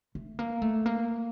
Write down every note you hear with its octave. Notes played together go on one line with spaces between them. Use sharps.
A3
A#3
A3
A#3